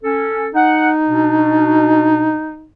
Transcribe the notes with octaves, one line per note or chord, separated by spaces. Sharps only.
C#4 A4
D#4 F#5
B2 D4